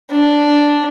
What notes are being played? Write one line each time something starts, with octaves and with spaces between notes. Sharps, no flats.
D4